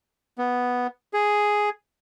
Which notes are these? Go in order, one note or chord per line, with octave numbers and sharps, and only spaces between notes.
B3
G#4